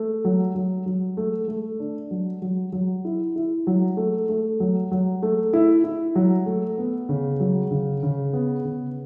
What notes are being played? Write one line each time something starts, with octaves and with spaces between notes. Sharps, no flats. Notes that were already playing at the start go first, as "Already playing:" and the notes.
Already playing: A3
F#3
F#3
F#3
A3
A3
D4
F#3
F#3
F#3
E4
E4
F#3
A3
A3
F#3
F#3
A3
E4
E4
F#3
A3
B3
C#3
F#3
C#3
C#3
B3
C#3